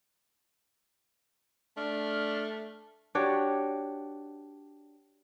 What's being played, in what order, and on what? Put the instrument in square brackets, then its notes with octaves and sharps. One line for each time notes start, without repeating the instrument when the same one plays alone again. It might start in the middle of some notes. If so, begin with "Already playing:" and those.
[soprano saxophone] A3 [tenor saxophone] D4 [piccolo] F6
[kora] D4 F#4 G4 C#5